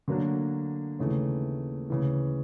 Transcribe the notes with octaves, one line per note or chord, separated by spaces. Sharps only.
D3 F#3 A#3 D4
D#2 C#3 E3 A3
D2 C#3 E3